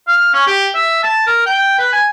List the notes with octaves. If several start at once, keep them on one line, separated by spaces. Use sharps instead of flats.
F5
C#4
G4
E5
A5
A#4
G5
B4
G#5